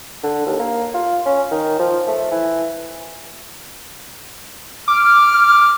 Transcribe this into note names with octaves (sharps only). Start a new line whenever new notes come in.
D3
D#2
A#3
F4
C#4
D#3
F3
A3
E3
D6 F6